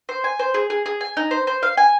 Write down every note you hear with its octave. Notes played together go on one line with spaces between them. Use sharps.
C5
G#5
C5
G#4
G#4
G#4
G#5
D#4
C5
C5
F5
G#5